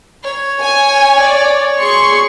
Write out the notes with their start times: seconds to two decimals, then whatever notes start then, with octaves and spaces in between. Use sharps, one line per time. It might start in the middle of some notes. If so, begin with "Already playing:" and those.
0.24 C#5
0.62 G#5
1.22 D5
1.78 G#4 C6 C#6